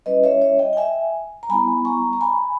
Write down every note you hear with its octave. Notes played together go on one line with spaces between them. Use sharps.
G3 C#4 E4 B4 D#5
C#5 E5
C#5 E5
D#5 G5
G5
E5 G#5
A#5
G3 B3 E4 G#5 B5
A#5 C#6
A#5
G#5 B5